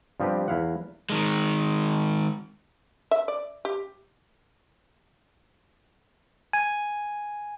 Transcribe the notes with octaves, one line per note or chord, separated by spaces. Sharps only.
G2 F3 B3 C4 G4 B4
E2 E4 F5 F#5
D#3 G#3
E5
D5
G4
G#5